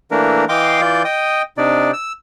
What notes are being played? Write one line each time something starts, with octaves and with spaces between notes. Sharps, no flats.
E3 A3 A#3 D4 A#4
E3 D#5 F5 G5 C6 D6
E3 F4 D5 G6
D#5 G5 D#6
C3 D4 D#4 D5
E6